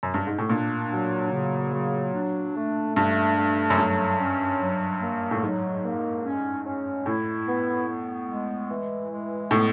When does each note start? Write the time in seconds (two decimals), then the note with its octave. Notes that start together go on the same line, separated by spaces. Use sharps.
0.03 F#2
0.14 G2
0.27 G#2
0.39 A2
0.50 A#2 D4
0.91 F#3
1.31 C#3
1.73 F#3
2.14 D4
2.55 A3
2.95 G2 D4
3.37 A3
3.70 F#2
3.78 G2 F#3
4.19 C#4
4.60 F#3
5.01 A#3
5.31 A2
5.42 G#2 F#3
5.83 A#3
6.24 C#4
6.65 C#4
7.06 A2 E4
7.46 B3
7.88 B3
8.28 G#3
8.69 E3
9.11 G#3
9.51 A2 B3